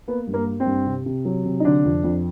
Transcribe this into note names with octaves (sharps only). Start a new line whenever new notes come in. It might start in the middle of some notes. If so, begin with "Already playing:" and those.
A#3 B3
G2
A#3
A#3
C4
G2
C3
C3
F#3
C3
D#4
D3 D4
F2
F2